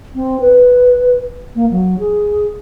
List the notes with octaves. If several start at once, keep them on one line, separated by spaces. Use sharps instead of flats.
C4
B4
A#3
F#3
G#4